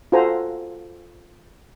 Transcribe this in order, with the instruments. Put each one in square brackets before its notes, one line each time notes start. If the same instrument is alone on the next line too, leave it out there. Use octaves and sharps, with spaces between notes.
[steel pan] F4 F#4 A4 C5 G#5 A#5